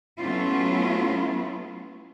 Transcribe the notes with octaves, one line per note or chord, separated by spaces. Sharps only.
F#3 A3 B3 C#4 E4 F4